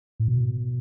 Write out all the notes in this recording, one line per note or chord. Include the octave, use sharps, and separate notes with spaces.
A2
B2